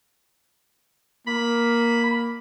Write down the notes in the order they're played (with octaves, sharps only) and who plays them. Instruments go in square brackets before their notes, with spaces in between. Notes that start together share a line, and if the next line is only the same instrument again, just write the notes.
[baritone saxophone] A#3 [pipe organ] B5